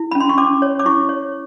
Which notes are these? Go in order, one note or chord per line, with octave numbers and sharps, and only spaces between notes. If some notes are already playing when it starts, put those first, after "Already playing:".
Already playing: E4
C#4 B5
C6
C#6
C#4 D6
C#5
D6
E4 C#6
C#5